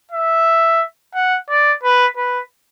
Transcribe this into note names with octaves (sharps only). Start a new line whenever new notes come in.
E5
F#5
D5
B4
B4